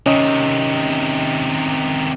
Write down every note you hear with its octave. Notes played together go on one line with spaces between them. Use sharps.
C3 D#3 C#4 D#5